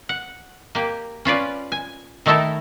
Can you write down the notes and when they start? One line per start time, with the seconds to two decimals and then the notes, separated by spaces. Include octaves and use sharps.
0.09 F#5
0.75 A#3 G4
1.25 C#4 F4 B4 D5
1.72 G#5
2.26 D#3 A3 D#4 E4 A4 A#4